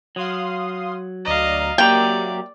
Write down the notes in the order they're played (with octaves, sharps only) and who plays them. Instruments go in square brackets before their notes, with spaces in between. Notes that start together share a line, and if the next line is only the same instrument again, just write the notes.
[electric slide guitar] F#3 [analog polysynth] F5 C6 D#6
[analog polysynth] D2 D5 A#5 [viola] D#5 F5
[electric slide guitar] F#3 E5 A#5 [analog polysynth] A#3 G4 [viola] D5 [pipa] G5